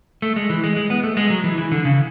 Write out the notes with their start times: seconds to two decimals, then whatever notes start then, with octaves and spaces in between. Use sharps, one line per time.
0.22 A3
0.36 G#3
0.50 E3
0.64 G#3
0.76 G#3
0.90 B3
1.03 A3
1.17 G#3
1.30 F#3
1.44 E3
1.58 E3
1.72 D3
1.85 C#3